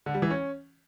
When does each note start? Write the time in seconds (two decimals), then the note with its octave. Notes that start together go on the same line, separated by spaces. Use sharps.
0.06 D3
0.14 G3
0.22 E3
0.30 C#4